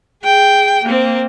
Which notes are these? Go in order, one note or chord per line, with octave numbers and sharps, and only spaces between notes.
G#4 G5
A#3 C4